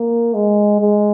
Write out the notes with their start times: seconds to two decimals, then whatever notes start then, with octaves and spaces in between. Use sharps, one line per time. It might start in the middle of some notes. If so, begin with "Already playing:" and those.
Already playing: A#3
0.34 G#3
0.81 G#3